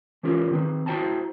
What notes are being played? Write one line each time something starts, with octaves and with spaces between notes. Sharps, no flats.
E3 C#4 F4 G4 A#4
D#3 C4 B4
E4 F#4 C5 G5 A5 A#5